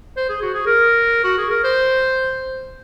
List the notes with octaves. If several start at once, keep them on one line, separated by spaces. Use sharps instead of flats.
C5
G#4
F#4
G#4
A#4
F#4
G#4
A#4
C5